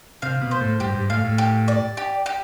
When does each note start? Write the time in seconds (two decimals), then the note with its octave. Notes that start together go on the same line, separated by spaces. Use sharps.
0.22 C3 F5
0.41 B2
0.51 C5
0.61 A2
0.80 G2 G4
0.95 G2
1.10 A2 F5
1.24 A2
1.38 G4
1.68 D5
1.97 G4
2.26 G4